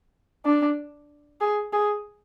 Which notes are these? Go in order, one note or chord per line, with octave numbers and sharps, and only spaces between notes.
D4
G#4
G#4